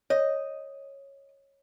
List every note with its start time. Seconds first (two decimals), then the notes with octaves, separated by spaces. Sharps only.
0.10 C#5 D#5